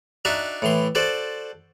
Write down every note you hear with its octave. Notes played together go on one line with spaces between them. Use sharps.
D4 D#4 F#4 E5
A2 E3 C6
F#4 A4 C5 D5